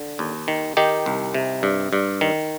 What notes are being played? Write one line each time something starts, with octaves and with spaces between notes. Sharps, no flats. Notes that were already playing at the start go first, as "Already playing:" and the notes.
Already playing: D3
D#2
D#3
D#3 D#4 G4
C2
C3
G2
G2
D#3